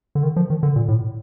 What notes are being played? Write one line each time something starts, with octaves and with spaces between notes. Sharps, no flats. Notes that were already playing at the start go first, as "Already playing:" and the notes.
D3
D#3
F3
D#3
D3
A#2
A2